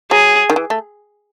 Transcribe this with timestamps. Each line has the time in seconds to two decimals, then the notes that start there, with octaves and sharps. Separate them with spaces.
0.11 F#3 G#4
0.50 D#3
0.56 E3
0.70 A3